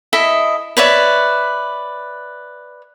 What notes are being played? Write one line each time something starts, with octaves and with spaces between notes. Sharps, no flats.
E4 A4 D#5 E5
B4 C#5 D5 E5